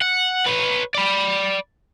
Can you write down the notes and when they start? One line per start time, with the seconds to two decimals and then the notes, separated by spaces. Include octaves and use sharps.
0.01 F#5
0.46 B4 C#5
0.95 D5 B5